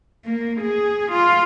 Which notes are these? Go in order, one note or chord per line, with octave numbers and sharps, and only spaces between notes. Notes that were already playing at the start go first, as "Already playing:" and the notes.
A#3
G#4
F4